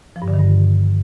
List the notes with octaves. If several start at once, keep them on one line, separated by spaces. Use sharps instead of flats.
F3
G2
D3
D#3
G2